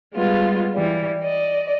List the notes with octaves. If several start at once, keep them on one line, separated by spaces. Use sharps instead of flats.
G3 G#3 B3 F4
E3 G3
D5 D#5